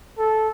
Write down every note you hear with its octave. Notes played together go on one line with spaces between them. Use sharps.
A4